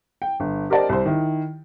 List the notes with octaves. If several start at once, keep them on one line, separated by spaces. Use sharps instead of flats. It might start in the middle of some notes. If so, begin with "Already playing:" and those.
G5
G1
G4 A#4 C5 D5 D#5 A5
C2 C5
D#3 E4